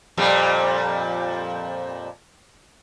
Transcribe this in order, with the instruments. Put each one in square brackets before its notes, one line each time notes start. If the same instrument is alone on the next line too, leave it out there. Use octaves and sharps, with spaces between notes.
[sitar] F2 A#2 G3